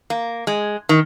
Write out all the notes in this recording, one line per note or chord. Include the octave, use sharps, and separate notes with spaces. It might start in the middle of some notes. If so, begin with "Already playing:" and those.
A#3
G#3
D#3